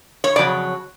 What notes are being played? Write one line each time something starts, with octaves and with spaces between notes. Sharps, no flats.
C#5
F2 C#3 F#3 D5